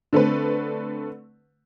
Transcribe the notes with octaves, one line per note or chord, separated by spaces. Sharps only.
D3 A3 C4 B4